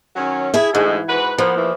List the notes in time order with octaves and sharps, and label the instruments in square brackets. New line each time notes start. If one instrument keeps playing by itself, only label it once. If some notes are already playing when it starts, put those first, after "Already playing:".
[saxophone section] D#3 F#3 C#4
[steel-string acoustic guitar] E4 G#4 E5
[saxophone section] D2 G#2 [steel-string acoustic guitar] E3
[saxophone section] G#2 F#4 B4
[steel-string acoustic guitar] F3 [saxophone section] A#3 B3
[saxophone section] E2 A#2 E3